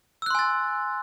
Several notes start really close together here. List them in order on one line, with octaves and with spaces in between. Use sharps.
E6 F#6 C6 G#5 A6